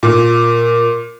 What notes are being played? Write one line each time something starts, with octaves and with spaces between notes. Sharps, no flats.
A#2